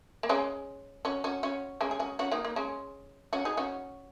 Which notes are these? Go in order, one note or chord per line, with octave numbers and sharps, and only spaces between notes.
A#3
G#3 C#4
C#4 F#4
C#4 F#4
C#4 F#4
G#3 C#4
G#4
C#4 F#4
C#4 F#4
A#3 D#4
A#3
G#3 C#4
C#4 F#4
D#4 G#4
C#4 F#4